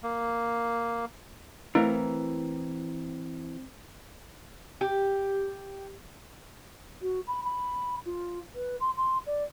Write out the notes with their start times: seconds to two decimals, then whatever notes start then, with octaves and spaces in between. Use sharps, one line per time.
0.03 A#3
1.75 E3 A3 C4 E4 A#4
4.81 G4
7.02 F#4
7.27 B5
7.44 B5
8.05 F4
8.55 B4
8.80 C6
8.97 C6
9.26 D5